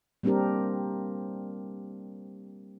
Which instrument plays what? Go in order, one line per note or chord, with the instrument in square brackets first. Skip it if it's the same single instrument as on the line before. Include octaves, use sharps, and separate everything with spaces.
[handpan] G3 A#3 C4 D4 G4 A#4